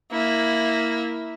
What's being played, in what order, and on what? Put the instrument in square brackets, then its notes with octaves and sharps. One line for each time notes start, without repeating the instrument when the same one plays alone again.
[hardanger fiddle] A#3 E4